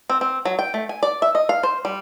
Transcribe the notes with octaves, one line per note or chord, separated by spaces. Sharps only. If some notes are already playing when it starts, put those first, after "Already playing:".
C4
C4
F#3
G5
A3
G#5
D5
E5
D#5
F5
C5
G3